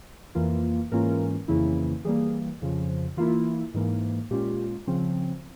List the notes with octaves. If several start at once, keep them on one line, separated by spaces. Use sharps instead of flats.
F2 E3 A#3 F4
G#2 E3 A#3 C#4 F4 A#4
F2 C#3 E3 A#3 E4
E3 G3 A#3 G#4
F2 C#3 F3
E3 A#3 E4 F4
G#2 E3 A#3
A#2 G#3 C#4 F4 G4
C#3 F3 C4